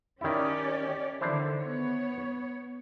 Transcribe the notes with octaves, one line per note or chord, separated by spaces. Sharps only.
D#3 C#4 E4 G4 D5
D3 D#3 D4 E4 C5
B3 C#5